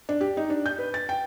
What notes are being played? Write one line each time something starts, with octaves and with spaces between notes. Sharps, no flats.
D4
G4
D#4
D4
G6
B4
A6
G5